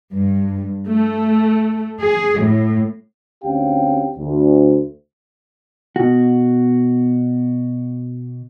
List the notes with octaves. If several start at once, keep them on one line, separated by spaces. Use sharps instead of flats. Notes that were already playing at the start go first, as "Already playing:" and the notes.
G2
A3
G#4
A2
D2 C4 C#4 G4 F5 G5
D2
B2 F#4